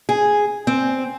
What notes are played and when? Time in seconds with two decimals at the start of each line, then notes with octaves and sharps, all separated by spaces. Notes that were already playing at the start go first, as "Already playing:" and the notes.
0.09 G#4
0.67 C4